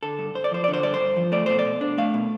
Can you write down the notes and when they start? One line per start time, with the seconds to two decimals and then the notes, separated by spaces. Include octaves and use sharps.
0.03 D3 A4
0.19 G2
0.35 G2 C5
0.44 D5
0.51 F3 C5
0.64 D3 D5
0.73 C5
0.83 G2 D5
0.94 C5
1.00 G2
1.16 F3
1.32 A3 D5
1.46 B2 C5
1.59 D5
1.65 B2
1.81 D4
1.98 A3 F5
2.14 B2